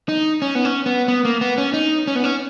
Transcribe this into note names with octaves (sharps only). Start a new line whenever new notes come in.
D#4
C#4
B3
C#4
B3
B3
A#3
B3
C#4
D#4
C#4
B3
C#4